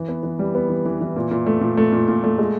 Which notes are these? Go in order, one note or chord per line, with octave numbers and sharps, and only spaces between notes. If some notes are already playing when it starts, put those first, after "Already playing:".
Already playing: E3
B3
E3
G3
B3
E3
E3
E3
A#2
A#2
A3
A#2
A3
A#2
A#2
A3
G#3